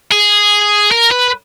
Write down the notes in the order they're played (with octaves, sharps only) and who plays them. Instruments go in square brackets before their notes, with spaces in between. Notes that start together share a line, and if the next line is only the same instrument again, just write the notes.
[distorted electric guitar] G#4
A#4
B4